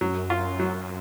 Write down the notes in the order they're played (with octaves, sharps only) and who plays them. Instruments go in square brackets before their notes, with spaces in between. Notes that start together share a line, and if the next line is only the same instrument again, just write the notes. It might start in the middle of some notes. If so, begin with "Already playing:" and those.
[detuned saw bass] F#2 [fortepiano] F#3
[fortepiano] F4
F#3